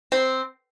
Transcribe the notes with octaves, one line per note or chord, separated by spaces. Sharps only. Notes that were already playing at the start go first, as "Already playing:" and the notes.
C4